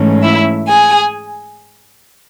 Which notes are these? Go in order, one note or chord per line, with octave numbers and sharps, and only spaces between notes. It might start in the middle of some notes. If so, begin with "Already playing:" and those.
Already playing: G#2 E3 A3 C#4
E4 E5
G#4 G#5